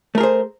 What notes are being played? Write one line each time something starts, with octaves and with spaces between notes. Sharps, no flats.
A3 G#4 A#4 C5